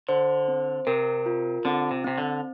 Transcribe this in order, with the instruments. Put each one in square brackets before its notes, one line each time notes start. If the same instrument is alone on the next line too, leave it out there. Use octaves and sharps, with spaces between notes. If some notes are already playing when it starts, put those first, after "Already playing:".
[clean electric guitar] D3 [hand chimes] C5
[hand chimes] C4
[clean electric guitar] C3 [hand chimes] A#4
[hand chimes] F4
[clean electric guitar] D3 [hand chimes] C4
[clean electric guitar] C3
[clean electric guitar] C3 [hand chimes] C4
[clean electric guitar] D3